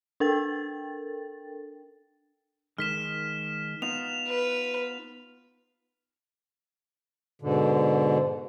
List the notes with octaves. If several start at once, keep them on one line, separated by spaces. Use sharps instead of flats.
D4 A4 A#4 G5 A6
D#3 G#3 F6 B6 E7
B3 D#4 F4 F7
B4
G#2 B2 D3